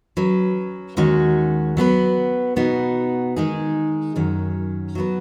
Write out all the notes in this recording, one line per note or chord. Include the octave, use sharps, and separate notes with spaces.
F#3 C#4 B4
D#2 D#3 G#3 C#4 F#4
F#3 B3 G#4 B4
B2 B3 D#4 F#4
D#3 G#3 D#4 G#4
F#2 D#3 F#3 C#4
F#3 B3 F#4 B4